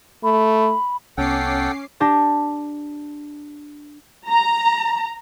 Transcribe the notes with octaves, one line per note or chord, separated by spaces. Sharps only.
A3 B5
C2 B3 C#4 A4 F#5 G5 D6 C7
D4 G4 A5 A#6
A#5